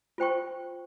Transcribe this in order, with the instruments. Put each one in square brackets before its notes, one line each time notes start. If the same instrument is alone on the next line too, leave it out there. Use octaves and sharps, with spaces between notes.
[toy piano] F4 C5 G5 C#6